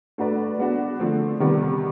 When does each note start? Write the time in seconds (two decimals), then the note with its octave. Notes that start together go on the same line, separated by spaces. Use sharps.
0.18 A3 D4 F#4 B4 D5
0.58 G#3 B3 D4 F#4
1.00 D3 F3 A3 C4
1.40 C3 D#3 G3 B3